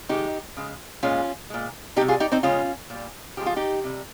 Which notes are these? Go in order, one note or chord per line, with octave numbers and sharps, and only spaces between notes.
C3 D#3 G#3 D#4 G4
C#3 G#3
A#2 G#3 C#4 F4
A#2 G#3
C3 G3 D#4 G4
F4 G#4
D#4 G4
C4 D#4
C#3 G#3 C#4 F4
A#2 G3
C#3 F3 G#3 G4
F4
D#4 G4
C3 G3